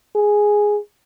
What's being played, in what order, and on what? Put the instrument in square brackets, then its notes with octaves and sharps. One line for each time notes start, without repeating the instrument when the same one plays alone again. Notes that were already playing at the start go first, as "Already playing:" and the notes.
[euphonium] G#4